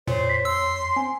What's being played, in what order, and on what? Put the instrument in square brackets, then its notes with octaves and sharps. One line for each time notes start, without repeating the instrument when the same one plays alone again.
[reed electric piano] F2 C#5 [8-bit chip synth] A#2 [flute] C5
[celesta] B6
[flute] C6 [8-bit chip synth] E6
[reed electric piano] C4 [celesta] G#5